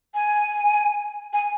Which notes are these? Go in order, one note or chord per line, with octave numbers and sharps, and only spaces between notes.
G#5
G#5